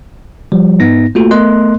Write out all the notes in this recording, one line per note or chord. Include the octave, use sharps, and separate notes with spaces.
F3 G3
G#2 B3 D#4 A#6
A3 A#3 F4 F#4 A4
A3 B3 A#4 D#5 C6 F#6